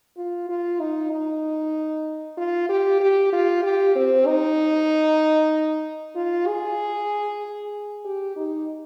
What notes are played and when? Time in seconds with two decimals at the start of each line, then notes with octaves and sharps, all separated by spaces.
0.17 F4
0.49 F4
0.80 D#4
1.11 D#4
2.37 F4
2.69 G4
3.00 G4
3.33 F4
3.64 G4
3.96 C4
4.27 D#4
6.16 F4
6.47 G#4
8.05 G4
8.37 D#4